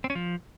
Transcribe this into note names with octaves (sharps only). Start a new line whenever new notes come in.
C4
C#4
F3